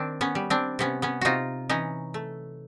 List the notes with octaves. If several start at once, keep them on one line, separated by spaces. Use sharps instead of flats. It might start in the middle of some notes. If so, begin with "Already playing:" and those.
Already playing: D#3 C4 D4
B3 C#4
G3
C4 D4
C3 B3 C#4
B3 C#4
C3 D#4 F4 F#4
E3 C#4 D#4
A3